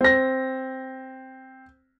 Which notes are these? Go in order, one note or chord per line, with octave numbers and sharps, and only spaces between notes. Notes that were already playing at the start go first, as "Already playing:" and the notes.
C4 A#6